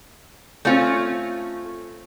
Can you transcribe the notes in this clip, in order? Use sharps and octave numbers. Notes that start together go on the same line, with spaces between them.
A3 C4 C#4 F4